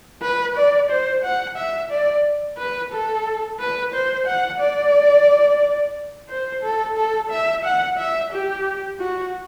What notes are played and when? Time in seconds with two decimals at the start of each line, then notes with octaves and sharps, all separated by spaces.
0.22 B4
0.56 D5
0.90 C5
1.23 F#5
1.57 E5
1.90 D5
2.58 B4
2.92 A4
3.59 B4
3.93 C5
4.26 F#5
4.60 D5
6.29 C5
6.63 A4
6.97 A4
7.31 E5
7.64 F#5
7.98 E5
8.32 G4
8.99 F#4